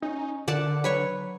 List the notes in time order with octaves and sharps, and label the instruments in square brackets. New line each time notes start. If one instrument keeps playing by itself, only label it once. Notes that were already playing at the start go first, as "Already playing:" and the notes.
[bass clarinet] C#4 [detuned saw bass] D#4
[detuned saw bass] D3 [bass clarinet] D#3 [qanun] D5 F#5 A5
[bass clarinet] F#3 [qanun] B4 C#5 C#6